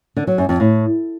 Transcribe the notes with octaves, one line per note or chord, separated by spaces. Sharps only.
D3
F#3
F#2
F2
A2